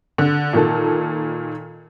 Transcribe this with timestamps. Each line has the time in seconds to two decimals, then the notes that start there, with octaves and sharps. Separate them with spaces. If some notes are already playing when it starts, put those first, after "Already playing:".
0.18 D3
0.53 A#2 D#3 A4